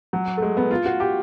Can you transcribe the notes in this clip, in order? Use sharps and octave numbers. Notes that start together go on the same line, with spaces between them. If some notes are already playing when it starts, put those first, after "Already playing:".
F#3
A3
G#3
B3
F4
F#4
G4